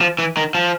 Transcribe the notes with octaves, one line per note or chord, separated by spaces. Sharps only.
F3
E3
D#3
F3